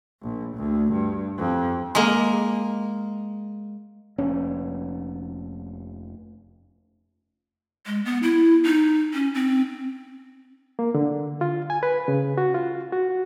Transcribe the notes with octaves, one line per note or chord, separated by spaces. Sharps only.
A#1
D2
G2
F2
G#3 A#3
F1 C#4
G#3
B3
E4
D#4
C#4
C4
A#3
D3
F4
G#5
B4
C#3
F#4
F4
F#4